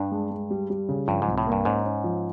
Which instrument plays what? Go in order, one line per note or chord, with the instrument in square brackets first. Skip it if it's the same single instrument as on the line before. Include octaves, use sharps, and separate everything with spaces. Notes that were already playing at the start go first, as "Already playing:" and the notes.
Already playing: [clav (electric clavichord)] G2 [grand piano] D4
[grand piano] G#3
G#3
G3
G3
C#3
[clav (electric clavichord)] G2 [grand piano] F3
[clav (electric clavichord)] G#2
[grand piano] C2
[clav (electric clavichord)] A2
[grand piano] A#3
[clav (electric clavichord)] G2
[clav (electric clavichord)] G#2 [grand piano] C#4
[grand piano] C#4
F3